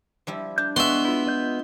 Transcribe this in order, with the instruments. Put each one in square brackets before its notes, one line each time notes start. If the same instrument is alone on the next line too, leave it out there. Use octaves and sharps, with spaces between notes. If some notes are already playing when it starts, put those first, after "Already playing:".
[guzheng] F3 G3 E4
[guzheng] D4 [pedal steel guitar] G6
[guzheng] G#3 D4 G4 [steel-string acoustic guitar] B3 [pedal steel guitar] B4 C#6 [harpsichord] E5 C6
[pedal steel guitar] E4 F4
F4 D#5 G6